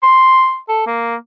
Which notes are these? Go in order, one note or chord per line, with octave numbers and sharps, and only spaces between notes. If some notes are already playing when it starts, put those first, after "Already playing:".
C6
A4
A#3